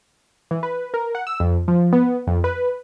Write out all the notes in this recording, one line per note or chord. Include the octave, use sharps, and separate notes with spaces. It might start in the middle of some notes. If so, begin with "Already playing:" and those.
E3
B4
A#4
F#5
E6
F2
F3
B3
F2
B4